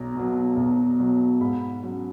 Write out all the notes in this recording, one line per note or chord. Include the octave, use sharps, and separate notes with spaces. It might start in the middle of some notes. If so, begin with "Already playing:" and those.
Already playing: B1 A#5
B2 F#3
B1
B2 F#3
G#2 B5
F#3 C#4